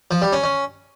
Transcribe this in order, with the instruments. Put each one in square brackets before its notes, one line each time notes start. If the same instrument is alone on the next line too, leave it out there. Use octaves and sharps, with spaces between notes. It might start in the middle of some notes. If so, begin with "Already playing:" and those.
[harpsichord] F3
G3
C#4
C#4